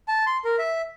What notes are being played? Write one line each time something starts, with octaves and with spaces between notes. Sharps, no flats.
A5
C6
A#4
E5